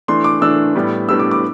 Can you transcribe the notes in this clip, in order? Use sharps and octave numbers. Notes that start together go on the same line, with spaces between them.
E3 A3 D4 C6
D6
E3 A3 D4 E6
A2 G3 B3 D4
A2 G3 B3 D4 E6
D6
D6